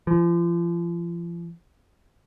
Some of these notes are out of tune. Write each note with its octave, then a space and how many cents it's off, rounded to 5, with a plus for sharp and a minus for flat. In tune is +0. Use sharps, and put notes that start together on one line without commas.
F3 -35